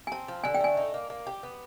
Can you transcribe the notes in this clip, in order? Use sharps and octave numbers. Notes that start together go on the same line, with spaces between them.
G#5
C4 A5
F3
D3 G#5
G5
A3 G#5
D#4
A#3
A#3
G4
B3